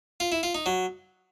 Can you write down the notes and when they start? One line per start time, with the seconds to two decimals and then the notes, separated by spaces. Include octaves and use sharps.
0.20 F4
0.32 E4
0.43 F4
0.55 D#4
0.66 F#3